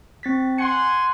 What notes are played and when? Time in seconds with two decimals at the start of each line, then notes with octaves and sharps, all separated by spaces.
0.23 C4 A6 B6
0.58 F#5 G#5 C6 C#7